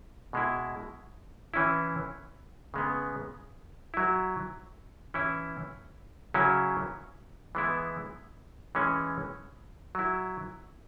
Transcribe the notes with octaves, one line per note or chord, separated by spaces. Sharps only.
B2 G#3 E4
E3 C#4 E4
C#3 G#3 B3
F#3 E4
E3 C#4 E4
C#3 F#3 C#4 E4
E3 G#3 B3 E4
E3 G#3 C#4
F#3 E4